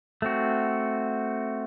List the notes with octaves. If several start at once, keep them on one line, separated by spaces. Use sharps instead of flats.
A3 C4 F#4